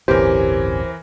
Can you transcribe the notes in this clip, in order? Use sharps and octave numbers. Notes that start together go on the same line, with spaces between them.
D1 G1 E3 C4 C#4 G4 A#4 C5